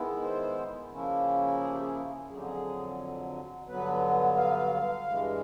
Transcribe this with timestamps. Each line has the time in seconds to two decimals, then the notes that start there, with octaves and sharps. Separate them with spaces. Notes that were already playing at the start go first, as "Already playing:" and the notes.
Already playing: D#3 G#3 B3 E4
0.22 C5
0.91 C#3 F3 A#3 C#4 E4
1.60 G#4
1.71 G4
1.81 G#4
2.29 F2 D3 F#3 G#4
2.36 G4
2.43 G#4
3.68 G2 D3 F#3 B3 B4
4.37 F5
5.06 G2 E3 G#3